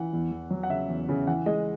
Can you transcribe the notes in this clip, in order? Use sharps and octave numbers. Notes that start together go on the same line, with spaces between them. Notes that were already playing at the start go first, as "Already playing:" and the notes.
Already playing: E3 F#5
E2
E2
F#3
F#5
C#3 E5
E2
C#3
E3 F#5
G#3 D#5